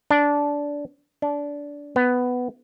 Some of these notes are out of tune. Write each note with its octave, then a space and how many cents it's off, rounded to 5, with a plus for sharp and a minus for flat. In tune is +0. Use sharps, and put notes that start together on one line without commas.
D4 -15
D4 -20
B3 +10